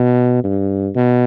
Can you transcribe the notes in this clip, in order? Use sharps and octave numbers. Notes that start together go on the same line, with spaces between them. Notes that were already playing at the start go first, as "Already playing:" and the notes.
Already playing: B2
G2
B2